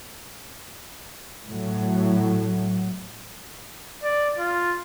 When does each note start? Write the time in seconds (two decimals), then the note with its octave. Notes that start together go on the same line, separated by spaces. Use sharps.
1.46 A2 F#3
4.03 D5
4.38 F4